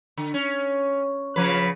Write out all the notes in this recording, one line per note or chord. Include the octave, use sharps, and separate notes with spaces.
D3
C#4
C#3 F3 B4